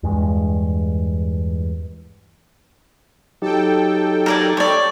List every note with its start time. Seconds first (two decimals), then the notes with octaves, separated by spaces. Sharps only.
0.03 E2 G2 G#3
3.42 F#3 D#4 G4 A4 G5
4.26 A#4 D5 G#5
4.57 C#5 D5